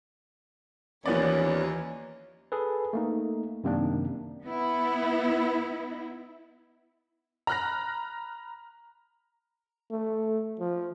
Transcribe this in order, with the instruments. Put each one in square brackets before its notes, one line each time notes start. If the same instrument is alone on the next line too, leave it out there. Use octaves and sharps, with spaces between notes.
[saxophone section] D#2 [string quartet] E3 C#5 [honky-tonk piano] F3 B3 D5 [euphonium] C#4
[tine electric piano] G#4 A4 B4
A3 A#3 D#4
F#2 C3 D#3 A#3 D4
[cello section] B3 E4
[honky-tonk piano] A#5 B5 F6 F#6 A#6
[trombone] A3
F3